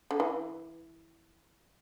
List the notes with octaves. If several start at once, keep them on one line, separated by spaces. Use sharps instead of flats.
D3
E3